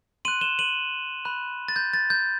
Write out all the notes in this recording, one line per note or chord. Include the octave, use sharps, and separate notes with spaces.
C6 F#6 D#7 F#7
E7 G7
D#7 F#7
B5 F#6
A6
G6
A6
G6